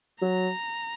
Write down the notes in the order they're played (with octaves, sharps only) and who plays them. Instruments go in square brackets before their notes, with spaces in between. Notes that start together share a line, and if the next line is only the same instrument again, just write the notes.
[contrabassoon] F#3 [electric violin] A#5